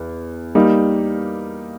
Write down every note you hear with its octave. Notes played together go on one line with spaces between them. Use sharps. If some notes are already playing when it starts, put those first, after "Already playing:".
Already playing: E2
G3 A#3 D#4